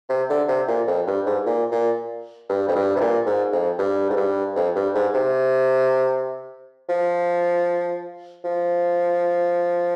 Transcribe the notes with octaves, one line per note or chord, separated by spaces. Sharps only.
C3
D3
C3
A#2
F2
G2
G#2
A#2
A#2
G2
F2
G2
C3
A#2
G#2
F2
G2
G#2
G2
F2
G2
G#2
C3
F3
F3